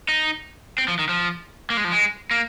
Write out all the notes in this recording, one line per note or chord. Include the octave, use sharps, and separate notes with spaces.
D#4
C4
F3
D#3
F3
A#3
G#3
F3
G#3
A#3